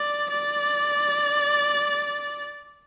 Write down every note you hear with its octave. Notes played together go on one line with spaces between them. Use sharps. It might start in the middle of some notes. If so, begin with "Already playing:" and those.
Already playing: D5
D5